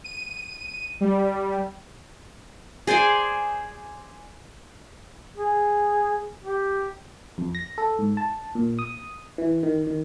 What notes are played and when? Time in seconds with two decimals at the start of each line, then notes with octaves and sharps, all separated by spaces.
0.04 D#7
1.01 G3
2.87 G#4 C5 D5 G#5
5.36 G#4
6.42 G4
7.38 F2
7.55 A#6
7.78 A4
7.99 G#2
8.17 A5
8.55 A#2
8.79 D#6
9.38 E3
9.63 D#3
9.87 D#3